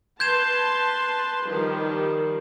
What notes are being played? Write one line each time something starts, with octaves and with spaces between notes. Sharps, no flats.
B4 A5 C6 G6 G#6 E7
D#3 F3 G3